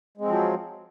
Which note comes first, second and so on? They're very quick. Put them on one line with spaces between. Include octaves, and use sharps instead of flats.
G#3 C4 F3 F#3